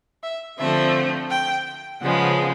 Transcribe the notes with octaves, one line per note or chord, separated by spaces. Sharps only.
E5
D3 F3 A3 C4 E5
G5
C#3 F3 G#3 B3 F#5